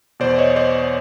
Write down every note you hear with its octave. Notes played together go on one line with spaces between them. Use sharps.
E2 B2 C5 D5
C#5 D#5
D#5
C5 D5